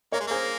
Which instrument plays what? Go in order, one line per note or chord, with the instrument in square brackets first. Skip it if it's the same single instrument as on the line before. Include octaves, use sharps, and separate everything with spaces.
[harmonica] A#3 [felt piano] A#4 C#5
[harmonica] G#3
[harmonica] A#3 [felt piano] G#4 C5